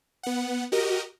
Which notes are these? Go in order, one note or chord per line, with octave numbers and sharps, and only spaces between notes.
B3 F#5
F#4 G4 A#4 D#5